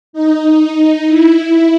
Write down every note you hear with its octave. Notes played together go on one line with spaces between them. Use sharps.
D#4
E4